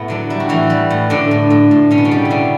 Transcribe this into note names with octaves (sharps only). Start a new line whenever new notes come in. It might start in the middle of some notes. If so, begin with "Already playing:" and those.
Already playing: A2 B3 E4
D3 F#3 D4
G3 E4
F#4
A2 E3 E4
G3
A2
A2 D3 D4
A2
A2
A2
B2 C#4
B3
C#3 C#4
G3
E4
B2 D3 D4